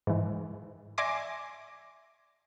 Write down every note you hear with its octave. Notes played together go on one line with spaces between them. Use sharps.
G#2 E3
D5 E5 G#5 C6 D6 A#6